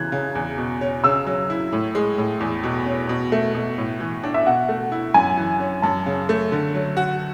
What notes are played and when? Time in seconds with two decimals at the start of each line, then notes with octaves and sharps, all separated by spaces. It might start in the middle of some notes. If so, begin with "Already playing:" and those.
Already playing: C#3 E3 F#6 G#6
0.12 C#3
0.35 E2
0.58 B2
0.81 C#4
1.04 C#3 E6
1.27 F#3
1.50 E4
1.72 A2
1.95 G#3
2.18 A2
2.40 E2
2.63 B2
2.86 C#4
3.09 B2
3.32 A3 E5
3.55 B2
3.78 A2
4.00 E3
4.23 D4
4.34 E5
4.46 B2 F#5
4.69 A3
4.92 E4
5.14 F#2 G#5
5.37 E3
5.60 C#4
5.82 F#2 A5
6.06 C#3
6.29 A3
6.52 D3
6.75 F#3
6.97 F#4